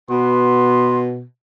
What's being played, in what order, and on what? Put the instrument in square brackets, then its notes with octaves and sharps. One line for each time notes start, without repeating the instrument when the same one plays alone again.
[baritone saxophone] B2 [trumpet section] B3 C6